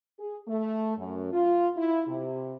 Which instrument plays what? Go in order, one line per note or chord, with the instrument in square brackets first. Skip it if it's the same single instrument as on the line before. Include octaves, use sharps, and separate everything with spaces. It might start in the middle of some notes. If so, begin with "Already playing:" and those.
[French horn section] G#4
A3
F#2
F4
E4
C3